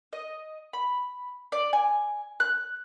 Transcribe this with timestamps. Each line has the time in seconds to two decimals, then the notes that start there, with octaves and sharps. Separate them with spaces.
0.13 D#5
0.73 B5
1.52 D5
1.73 G#5
2.40 F#6